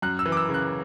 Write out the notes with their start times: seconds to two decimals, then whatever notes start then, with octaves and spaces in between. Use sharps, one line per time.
0.02 F#2 F#6
0.19 E6
0.26 E3
0.32 D6
0.37 E6
0.49 C#3
0.54 F#6